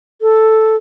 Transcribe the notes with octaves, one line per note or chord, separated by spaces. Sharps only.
A4